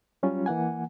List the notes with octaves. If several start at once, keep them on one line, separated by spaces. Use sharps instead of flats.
F#3 G3 C#4 F4
E3 A#3 F#5 G#5